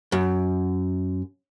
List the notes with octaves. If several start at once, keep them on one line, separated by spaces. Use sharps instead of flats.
F#2